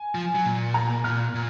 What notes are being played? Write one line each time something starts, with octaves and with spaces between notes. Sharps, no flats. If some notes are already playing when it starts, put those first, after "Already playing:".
Already playing: G#5
F3
F#3
A#2
A#5
A#2 F6
A#2